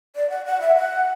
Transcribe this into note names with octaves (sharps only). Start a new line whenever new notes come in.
D5
F#5
F#5
E5
F#5